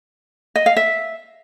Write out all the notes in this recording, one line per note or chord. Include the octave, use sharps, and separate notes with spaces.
D#5
F5
E5